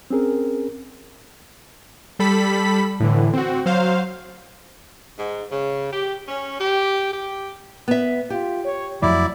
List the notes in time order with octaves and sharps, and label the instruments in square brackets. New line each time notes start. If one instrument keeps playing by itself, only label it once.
[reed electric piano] C4 C#4 G#4 A#4
[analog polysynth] G3 A4 B5 B6
A2 D3 E3
C4 F#4
F#3 C5 F5
[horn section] G#2
C#3
G4
C#4
G4
G4
[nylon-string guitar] B3 E5
[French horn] F4 [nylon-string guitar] G4
[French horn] C#5
[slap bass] F2 F3 A3 [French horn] F#3 [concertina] E4 D5